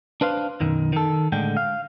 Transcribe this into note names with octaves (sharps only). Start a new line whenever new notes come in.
D4 B4 C5 F5
B1 F#2 D#3
D#3 A4
A2 D3 G#3 G5
F5